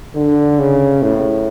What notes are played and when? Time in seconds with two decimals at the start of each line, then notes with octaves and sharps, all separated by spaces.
0.15 D3
0.59 C#3
1.02 A2